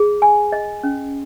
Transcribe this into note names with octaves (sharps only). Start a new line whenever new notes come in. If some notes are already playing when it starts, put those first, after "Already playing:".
Already playing: G#4
G#5
D#5
C#4